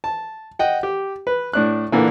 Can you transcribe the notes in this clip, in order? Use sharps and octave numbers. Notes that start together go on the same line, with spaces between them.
A5
D#5 F#5 G5
G4
B4
A2 D4 F#6
A#2 D3 E3 A#3